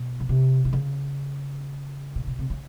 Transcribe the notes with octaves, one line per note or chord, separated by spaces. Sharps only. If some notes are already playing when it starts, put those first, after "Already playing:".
Already playing: B2
C#3
C3
C3
C#3
A#2
B2
C3
C#3